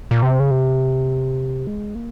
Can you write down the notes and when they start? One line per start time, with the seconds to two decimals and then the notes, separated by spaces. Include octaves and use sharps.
0.11 A#2
0.22 C3
0.40 C#3
0.51 C3
1.67 G#3
1.95 A#3